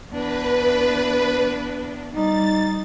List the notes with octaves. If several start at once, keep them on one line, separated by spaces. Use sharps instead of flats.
E2 D4 B4
G3 D#4 A6